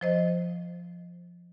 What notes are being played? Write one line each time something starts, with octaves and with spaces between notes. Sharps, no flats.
F3 C5 D#5